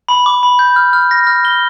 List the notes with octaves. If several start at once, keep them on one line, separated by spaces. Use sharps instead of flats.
B5
D6
B5
G6
F6
F6
A#6
F6
G7